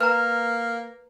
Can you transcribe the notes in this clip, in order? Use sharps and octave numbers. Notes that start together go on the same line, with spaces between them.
A#3 B4 A#5 F6